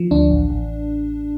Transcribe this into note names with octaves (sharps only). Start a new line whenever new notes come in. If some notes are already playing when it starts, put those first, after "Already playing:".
Already playing: F3
D2 D4
A1
A1